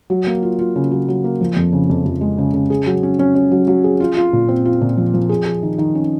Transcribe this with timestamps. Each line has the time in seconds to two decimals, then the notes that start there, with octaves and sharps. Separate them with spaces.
0.10 F#3
0.27 A#3
0.43 F4
0.59 F4
0.76 C#3
0.91 F#3
1.08 F#3
1.24 A#3
1.41 F3
1.57 F2
1.73 C#3
1.90 F2
2.06 F2
2.21 G#3
2.38 C#3
2.54 C#3
2.70 G#4
2.86 F#3
3.03 C#4
3.19 C#4
3.35 C#4
3.52 F#3
3.68 F#3
3.84 G#4
4.00 F4
4.17 F4
4.33 A#2
4.49 C4
4.65 F4
4.81 A#2
4.97 F3
5.14 F3
5.29 G#4
5.46 G#4
5.63 D#3
5.78 D#3
5.95 C#4